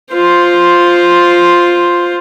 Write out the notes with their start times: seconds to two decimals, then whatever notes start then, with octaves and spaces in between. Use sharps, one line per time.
0.12 F4 C5